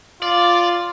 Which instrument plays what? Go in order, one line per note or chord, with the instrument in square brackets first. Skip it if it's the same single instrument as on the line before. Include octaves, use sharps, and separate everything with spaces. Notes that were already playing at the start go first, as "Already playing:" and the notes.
[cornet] F4 [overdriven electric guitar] D5